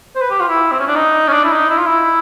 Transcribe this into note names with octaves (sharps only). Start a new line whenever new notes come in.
C5
B4
G4
F4
E4
C4
C#4
D4
D#4
C#4
D4
E4
D#4
E4
F4
E4